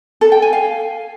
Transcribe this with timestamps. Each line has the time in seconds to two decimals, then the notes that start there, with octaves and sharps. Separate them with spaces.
0.21 A4
0.32 G5
0.42 G#5
0.53 F5